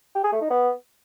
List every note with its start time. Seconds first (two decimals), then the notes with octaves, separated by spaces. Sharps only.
0.15 G4
0.24 G#4
0.33 A3
0.41 D#4
0.50 B3